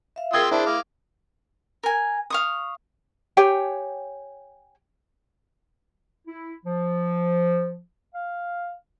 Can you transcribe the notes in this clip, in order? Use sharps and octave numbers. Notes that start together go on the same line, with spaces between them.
E5 F5
F4 G#4 A#4 G5 C6 D#6 E6 G#6
D4 E4 G#4 C5 D5
F5 D6
A#4 G#5
F5 C#6 D#6
G4 C#5 G5 G#5
E4
F3
F5